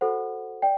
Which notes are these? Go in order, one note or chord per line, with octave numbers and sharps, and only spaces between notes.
F#4 A4 C5 F#5
D5 G5